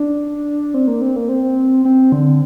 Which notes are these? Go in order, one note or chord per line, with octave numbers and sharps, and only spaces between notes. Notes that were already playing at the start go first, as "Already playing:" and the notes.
Already playing: D4
C4
A#3
C4
A#3
C4
C4
D3